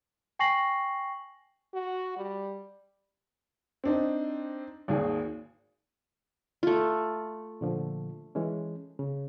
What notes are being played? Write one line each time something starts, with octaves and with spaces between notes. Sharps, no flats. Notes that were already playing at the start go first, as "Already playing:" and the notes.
G5 G#5 C#6 A#6 C7 F#7
F#4
G3
C4 D4 D#4
G#1 D#2 G#4
A3 F4
A#2 D3 F3
E3 G#3 C#4
C#3